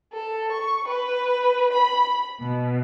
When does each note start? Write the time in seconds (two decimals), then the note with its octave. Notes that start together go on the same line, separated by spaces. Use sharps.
0.13 A4
0.53 C#6
0.89 B4
1.73 B5
2.40 B2